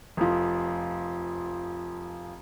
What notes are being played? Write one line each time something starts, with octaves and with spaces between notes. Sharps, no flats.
F1 F3